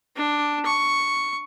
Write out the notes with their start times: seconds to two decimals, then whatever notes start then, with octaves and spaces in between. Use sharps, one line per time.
0.16 D4
0.65 C#6